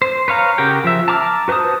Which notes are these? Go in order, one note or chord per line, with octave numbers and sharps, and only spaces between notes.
C5
B4 C#5 F5 A#5
C#3 F#4 G4 A#4 G5
F3 E5
A5 A#5 D6 E6 F6
F#4 B4 C5 A5 D#6